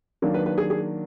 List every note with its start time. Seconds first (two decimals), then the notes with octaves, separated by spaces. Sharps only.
0.22 D#3 F#3 A#3 D4
0.34 B4
0.46 B4
0.58 G#4
0.70 G#4